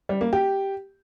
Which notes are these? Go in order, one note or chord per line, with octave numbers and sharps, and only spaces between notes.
G3
A#3
G4